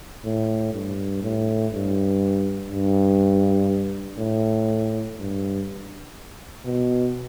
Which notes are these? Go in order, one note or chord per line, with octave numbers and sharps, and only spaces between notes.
A2
G2
A2
G2
G2
A2
G2
B2